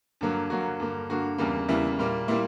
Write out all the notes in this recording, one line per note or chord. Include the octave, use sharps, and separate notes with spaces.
G2 D3 F#3 A#3
G2 D3 F#3 A#3 F#4
G2 D3 A#3
G2 D3 A#3 F#4
E2 C#3 G3 A#3
E2 C#3 G3 A#3 E4
A#2 G3 A#3
A#2 G3 A#3 E4